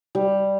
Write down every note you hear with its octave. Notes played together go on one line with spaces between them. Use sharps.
G3